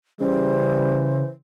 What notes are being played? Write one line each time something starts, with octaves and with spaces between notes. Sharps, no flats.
C#3 E3 G3 C5